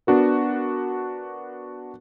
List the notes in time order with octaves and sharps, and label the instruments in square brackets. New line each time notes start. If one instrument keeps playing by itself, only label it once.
[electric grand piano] B3 D4 F#4 A#4